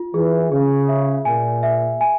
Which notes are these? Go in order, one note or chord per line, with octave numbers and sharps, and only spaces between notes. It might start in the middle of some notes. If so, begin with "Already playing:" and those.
Already playing: F4
E3 G#4
C#3 G#4
E5
A#2 G#5
E5
G#5